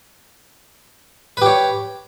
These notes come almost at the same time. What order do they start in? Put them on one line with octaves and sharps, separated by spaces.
B4 G4 C#5